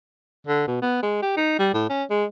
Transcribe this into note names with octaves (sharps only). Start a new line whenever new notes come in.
D3
B2
B3
G#3
G4
D#4
G3
A2
C#4
G#3